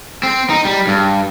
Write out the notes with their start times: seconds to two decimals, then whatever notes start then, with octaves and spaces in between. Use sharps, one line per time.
0.23 C4
0.50 D#4
0.65 G3
0.87 G2